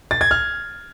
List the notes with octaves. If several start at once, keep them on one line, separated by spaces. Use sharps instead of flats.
A6
G#6
F6